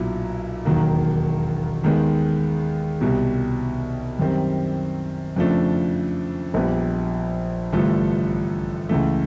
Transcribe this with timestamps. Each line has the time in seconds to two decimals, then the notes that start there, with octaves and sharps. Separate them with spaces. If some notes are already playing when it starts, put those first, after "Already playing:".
Already playing: B1 A#2 F#3 B3 E4
0.65 E1 D#2 D#3 F#3 A#3
1.84 D#2 D#3 G#3 B3
3.01 C2 B2 G3
4.19 F#2 D#3 G3 C4
5.36 F2 C#3 F3 A3 D4
6.54 A#1 A#2 G3 B3
7.73 A1 G2 D3 F3 A3
8.89 C#2 C#3 E3 A3